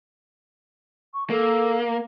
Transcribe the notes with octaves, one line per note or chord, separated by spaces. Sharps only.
C#6
A#3 A4